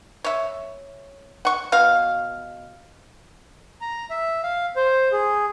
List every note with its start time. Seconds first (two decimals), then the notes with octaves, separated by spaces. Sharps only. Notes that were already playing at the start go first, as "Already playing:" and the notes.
0.24 C#5 E5
1.45 F#5 C#6
1.72 B2 F5
3.81 A#5
4.10 E5
4.43 F5
4.76 C5
5.12 G#4